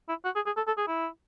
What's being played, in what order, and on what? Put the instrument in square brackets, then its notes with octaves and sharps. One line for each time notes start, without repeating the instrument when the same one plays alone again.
[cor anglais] E4
F#4
G#4
G#4
A4
A4
G#4
E4